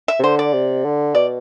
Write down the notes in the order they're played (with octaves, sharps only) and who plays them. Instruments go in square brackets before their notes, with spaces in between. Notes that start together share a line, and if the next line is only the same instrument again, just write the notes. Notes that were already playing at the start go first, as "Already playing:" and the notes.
[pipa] E5
[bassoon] C3
[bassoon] D3 [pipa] C5
[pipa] D5
[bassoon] C3
D3
[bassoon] B2 [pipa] D5